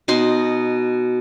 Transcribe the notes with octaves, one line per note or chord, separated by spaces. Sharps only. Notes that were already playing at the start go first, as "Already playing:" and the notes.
B2 D#4 C6